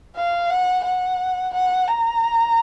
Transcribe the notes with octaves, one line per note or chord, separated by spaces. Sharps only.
F5
F#5
F#5
F#5
A#5